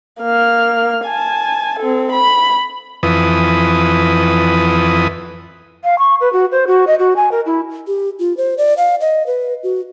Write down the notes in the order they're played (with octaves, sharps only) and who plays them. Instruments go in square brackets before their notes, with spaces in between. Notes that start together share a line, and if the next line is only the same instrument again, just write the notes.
[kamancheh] A#3 F6
G#5 A5
C4 A4
B5
[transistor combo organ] F2 E3 B4 D#6
[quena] F5
C#6
B4
F#4
C5
F#4
D#5
F#4
G#5
A#4
E4
[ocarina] G4
F4
C5
D5
F5
D#5
B4
F#4